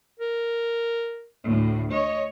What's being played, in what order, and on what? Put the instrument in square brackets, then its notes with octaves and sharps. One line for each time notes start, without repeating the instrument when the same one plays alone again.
[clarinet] A#4
[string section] D2 A2
[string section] C#5 [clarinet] D#5